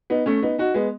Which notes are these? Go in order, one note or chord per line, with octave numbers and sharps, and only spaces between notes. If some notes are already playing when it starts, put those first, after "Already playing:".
B3 D#4
A3 C#4
B3 D#4
D#4 F#4
G#3 B3